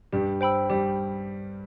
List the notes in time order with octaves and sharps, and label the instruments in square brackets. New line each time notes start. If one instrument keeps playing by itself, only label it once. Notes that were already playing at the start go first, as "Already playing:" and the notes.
[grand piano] G2 G3 [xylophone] G4
[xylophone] C5 G5 B5 E6
[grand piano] G3 [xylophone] G4